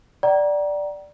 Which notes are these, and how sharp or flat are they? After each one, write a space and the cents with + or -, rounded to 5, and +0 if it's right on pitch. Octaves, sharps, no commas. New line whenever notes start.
D5 +0 G5 -45 A#5 +25